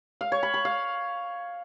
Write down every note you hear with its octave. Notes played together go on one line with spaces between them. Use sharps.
F5
C#5
B5
B5
F5